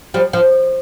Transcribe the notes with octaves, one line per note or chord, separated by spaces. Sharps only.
F3 G3
F3